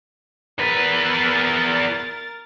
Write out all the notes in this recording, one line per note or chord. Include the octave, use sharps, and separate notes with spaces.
E2 A#4 B4 A6